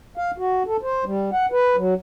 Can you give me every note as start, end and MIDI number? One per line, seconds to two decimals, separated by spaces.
0.17 0.31 77
0.38 0.63 66
0.67 0.77 69
0.82 1.04 72
1.04 1.30 55
1.33 1.46 78
1.52 1.76 71
1.76 1.94 54